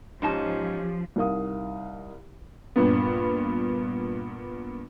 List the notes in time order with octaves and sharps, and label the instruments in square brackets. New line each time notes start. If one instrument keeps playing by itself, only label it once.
[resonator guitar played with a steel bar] G#2 D#4 A5 [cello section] F3 [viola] C#4 [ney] G4
[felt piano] C2 D#4 A#4 F5 D#6
[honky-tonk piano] G2 A#2 B3